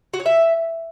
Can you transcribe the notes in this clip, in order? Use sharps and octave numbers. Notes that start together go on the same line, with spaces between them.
F#4
C#5
E5